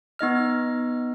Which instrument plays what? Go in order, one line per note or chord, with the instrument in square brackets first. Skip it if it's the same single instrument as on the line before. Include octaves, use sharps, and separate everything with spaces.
[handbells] B3 D#4 D#5 F6